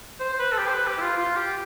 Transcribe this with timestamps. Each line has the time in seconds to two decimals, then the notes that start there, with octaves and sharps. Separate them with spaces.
0.20 C5
0.33 C5
0.39 B4
0.52 A4
0.58 G4
0.68 C5
0.73 B4
0.87 G4
0.98 E4
1.02 F4
1.17 F4
1.36 G4